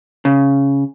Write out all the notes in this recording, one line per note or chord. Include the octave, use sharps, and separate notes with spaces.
C#3